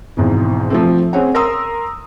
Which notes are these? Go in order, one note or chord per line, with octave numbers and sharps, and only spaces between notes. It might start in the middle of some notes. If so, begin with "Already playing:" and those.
G#1 G#2 B2 E3
F3 A3 C4
C4 C#4 G#4 C#5 F#5
A#4 C6 D#6 E6